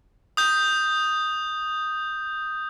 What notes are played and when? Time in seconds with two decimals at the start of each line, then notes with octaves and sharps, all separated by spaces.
0.37 D#6 G6